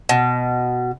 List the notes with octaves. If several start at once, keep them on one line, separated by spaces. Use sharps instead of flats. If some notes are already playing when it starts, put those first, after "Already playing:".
B2